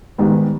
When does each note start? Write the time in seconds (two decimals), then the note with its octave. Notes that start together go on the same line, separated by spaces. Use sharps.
0.18 G#2 D#3 G3 B3